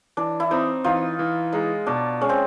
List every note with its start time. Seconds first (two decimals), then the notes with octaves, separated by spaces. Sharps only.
0.17 E3 D4
0.40 E4
0.51 C4 D#4
0.84 E3 D#4 F4
1.19 E3
1.52 G#3 D#4
1.87 B2 D4
2.21 G#3 C#4
2.29 C4